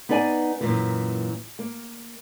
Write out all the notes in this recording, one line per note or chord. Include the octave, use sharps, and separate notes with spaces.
B3 D#4 B4 D5 G5 G#5
F#2 A#2 E3
A#3